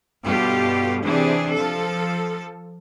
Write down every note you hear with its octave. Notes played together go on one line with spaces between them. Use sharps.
G2 B2 F4 G4 A4
C3 E3 C4 D4 G#4
F3 A4